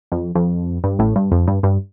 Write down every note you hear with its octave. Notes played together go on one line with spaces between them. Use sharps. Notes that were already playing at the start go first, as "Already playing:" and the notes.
F2
F2
G2
A1 A2
G2
F2
G2
G2